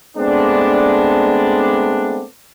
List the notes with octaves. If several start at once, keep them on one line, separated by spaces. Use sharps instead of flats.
G#3 A3 B3 C4 D4